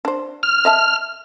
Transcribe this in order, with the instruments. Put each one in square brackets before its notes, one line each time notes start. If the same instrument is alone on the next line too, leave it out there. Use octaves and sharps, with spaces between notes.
[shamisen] D4 C5
[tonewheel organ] F6
[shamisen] D#5 E5 A5